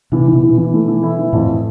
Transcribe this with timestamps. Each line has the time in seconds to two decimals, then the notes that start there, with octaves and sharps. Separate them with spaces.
0.12 C3 E3
0.28 E3
0.33 B2
0.43 E3
0.53 B2 E3
0.73 A3
0.88 E3
1.03 E4
1.19 E3
1.33 F2 A2